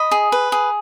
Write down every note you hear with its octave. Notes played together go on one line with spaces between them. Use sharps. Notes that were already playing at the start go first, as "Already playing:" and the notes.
Already playing: D#5 B5
G#4
B4
G#4